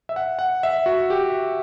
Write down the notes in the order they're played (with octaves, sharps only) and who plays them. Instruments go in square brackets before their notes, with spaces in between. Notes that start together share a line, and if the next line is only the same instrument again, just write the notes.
[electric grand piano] E5
F#5
F#5
E5
F#4
G4